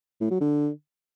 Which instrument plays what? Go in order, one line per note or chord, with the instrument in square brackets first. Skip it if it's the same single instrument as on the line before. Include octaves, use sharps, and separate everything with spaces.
[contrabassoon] A2
F#3
D3